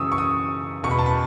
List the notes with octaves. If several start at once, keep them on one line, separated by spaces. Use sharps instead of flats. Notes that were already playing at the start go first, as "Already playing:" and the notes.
Already playing: F#2 C#3 E3 C#6 D#6 E6
C#6
D#6
E2 B2 C#6
B5
A5
B5